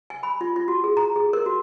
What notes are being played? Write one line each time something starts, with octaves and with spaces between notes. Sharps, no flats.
G#5
B5
F4
F4
F#4
G#4
A#5
G#4
A#4
F#4